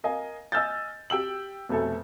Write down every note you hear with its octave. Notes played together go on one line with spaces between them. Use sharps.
A#4 D#5 F5 G#5
D#5 G#5 E6 F6 G6 A6
G4 G5 E6 F#7
F1 B2 A3 A4 G#5